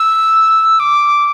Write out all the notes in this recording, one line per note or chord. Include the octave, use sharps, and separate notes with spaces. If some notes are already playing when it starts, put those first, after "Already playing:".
Already playing: E6
D6